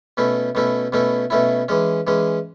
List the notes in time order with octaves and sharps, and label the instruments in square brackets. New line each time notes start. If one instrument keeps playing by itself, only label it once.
[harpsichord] B2 A3 C#4 E4
B2 A3 C#4 E4
B2 A3 C#4 E4
B2 A3 C#4 E4
E3 G#3 C#4
E3 G#3 C#4